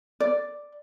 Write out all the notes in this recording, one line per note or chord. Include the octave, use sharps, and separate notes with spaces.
D5